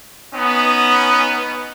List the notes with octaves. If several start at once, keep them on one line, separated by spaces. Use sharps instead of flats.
B3 C#4 D#4